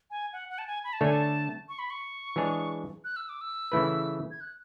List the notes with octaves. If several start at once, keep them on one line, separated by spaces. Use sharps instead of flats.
G#5
F#5
F#5
A5
G#5
B5
A5
D3 A3 D4 A4 C#5 G#5
A5
C#6
B5
C#6
E3 G#3 D4 G#4 C#5
F#6
E6
D6
E6
C#3 E3 A3 E4 B4
G#6
F#6